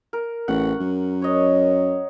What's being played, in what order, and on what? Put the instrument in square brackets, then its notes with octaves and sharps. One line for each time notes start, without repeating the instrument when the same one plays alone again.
[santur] A#4
[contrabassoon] A1 [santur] F#5 C#6
[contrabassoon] F#2
[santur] C#5 D#5